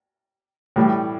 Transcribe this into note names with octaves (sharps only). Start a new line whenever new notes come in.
A2 E3 G3